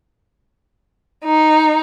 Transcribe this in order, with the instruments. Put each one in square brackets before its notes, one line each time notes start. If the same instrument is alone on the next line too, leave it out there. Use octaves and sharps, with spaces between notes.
[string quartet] D#4